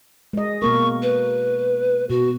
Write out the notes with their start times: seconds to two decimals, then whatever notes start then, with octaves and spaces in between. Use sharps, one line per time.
0.33 G#3 D#5
0.62 B2 A#3 A#4 C#6
1.02 B4
2.09 B2 F#4